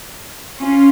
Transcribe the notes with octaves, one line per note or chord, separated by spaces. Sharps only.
C#4 F4